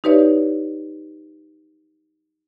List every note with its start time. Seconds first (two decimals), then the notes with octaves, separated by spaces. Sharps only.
0.04 D#4 G4 B4 C#5 D5 E5